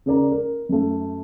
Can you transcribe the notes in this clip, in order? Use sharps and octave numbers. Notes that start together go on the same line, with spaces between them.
C#3 A#4 D5 A#5
A#4
F#2 A3